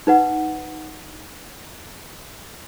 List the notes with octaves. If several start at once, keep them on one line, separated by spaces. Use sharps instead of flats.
D#4 B4 F#5